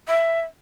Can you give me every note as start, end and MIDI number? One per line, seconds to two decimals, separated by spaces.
0.08 0.40 76